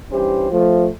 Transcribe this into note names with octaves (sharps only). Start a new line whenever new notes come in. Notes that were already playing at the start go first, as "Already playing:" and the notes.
G2 E3 C#4 E4 G4 C5
F3 A3